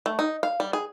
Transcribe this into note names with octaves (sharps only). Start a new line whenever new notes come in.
A3
D#4
F5
G3
G#4